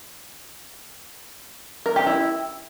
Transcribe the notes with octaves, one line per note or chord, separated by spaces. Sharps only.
A#4
G4
E4